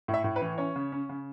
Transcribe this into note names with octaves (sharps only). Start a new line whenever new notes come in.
A2
E5
A2
B4
E3
C#4 C#5
C#3
C#4
C#3